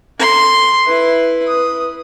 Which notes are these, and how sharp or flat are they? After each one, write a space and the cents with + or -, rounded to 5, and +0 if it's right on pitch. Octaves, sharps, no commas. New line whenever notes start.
A4 +15 C6 +0
E4 +0 B4 +0
B4 -15 D#6 +0